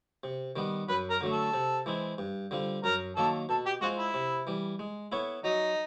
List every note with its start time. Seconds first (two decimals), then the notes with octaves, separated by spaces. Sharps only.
0.24 C3
0.56 D#3 G3 B3
0.89 F#2 B4
1.10 A#4
1.21 D3 F#3 A3
1.32 A4
1.54 C3
1.86 E3 G#3 C4 E4
2.18 G2
2.51 D3 G3 C4 F4
2.84 F#2 A#4
3.16 D#3 F#3 A#3 A4
3.49 B2 A4
3.66 G4
3.81 G#3 C4 F4 F#4 G#4
3.98 E4
4.14 C3
4.47 E3 G3
4.79 G#3
5.12 B3 E4 A4 C#5
5.44 F#3 D#4